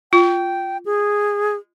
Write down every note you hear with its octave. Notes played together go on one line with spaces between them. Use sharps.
F4 G5
G#4